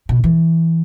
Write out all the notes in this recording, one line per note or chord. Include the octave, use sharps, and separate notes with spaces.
B2
E3